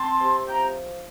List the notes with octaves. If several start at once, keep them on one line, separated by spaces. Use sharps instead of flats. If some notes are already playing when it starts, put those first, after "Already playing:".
Already playing: C4 A5 C6
C3
F3 G5 A#5